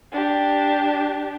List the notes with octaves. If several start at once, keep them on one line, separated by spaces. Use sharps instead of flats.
D4 G4